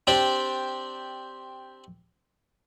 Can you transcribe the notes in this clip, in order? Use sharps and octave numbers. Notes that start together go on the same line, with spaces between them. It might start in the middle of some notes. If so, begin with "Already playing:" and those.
C4 D4 G4 C5 D5